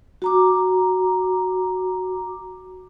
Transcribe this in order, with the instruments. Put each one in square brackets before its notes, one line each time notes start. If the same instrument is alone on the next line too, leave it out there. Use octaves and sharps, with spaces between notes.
[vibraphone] F#4 A#5 D6